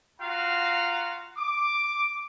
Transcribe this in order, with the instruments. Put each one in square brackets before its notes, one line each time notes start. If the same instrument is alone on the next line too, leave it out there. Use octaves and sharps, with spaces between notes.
[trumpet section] F4 F#4 F5 F#5 A#5
D6